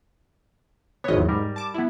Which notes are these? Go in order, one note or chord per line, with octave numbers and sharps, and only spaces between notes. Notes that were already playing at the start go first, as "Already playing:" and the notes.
G#1 B3 C#5 D#5
E2 F#3
G#2 G3 A#4
A5 D6
B3 E4